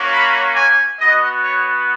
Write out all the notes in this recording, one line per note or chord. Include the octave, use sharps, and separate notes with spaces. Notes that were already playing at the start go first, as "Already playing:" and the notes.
Already playing: A#3 C#4 F#4
B5
G#5
B3 F#4 D#5
C#5